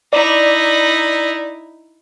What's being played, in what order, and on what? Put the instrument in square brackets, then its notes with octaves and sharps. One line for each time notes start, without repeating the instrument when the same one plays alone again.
[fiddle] D#4 E4 [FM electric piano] D5